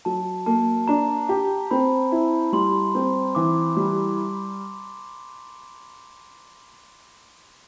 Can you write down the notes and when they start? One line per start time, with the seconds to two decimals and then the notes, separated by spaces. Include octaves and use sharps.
0.05 F#3 A5
0.46 A#3 A5
0.88 D4 A#5
1.29 G4
1.71 C4 B5
2.12 E4
2.53 G3 C6
2.95 C4
3.35 E3 D6
3.77 G3